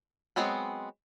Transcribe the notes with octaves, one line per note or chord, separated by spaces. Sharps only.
F#3 G#3 B3 C4 B4